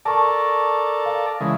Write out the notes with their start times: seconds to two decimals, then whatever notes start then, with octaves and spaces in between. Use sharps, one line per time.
0.05 A4 A#4 D5 A5 C#6
1.06 F5
1.41 C#3 E3 G#3